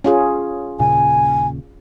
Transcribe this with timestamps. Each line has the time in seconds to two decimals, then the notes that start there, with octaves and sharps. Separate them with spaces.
0.04 C#4 F4 G#4
0.79 D#1 A#2 C#3 G#5